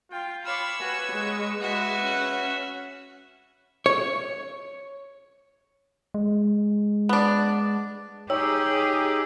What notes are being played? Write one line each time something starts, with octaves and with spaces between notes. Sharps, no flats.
F4 G5
C#5 F5 B5 D6 E6
F#4 B4 G#5
G#3 B4 C#6
G#3 F#4 B4 E5
C#4 F#5
C#5
G#3
B3 D4
D#4 G4 G#4 C#5 G5 E6